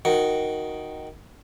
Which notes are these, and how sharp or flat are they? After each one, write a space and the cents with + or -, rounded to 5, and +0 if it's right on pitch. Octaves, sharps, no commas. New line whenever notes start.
D#3 +0 F#4 +0